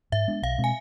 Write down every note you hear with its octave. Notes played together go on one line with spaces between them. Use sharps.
G#2 E5
G#3 B3 D4
B1 F5
B2 G#3 C4
G#5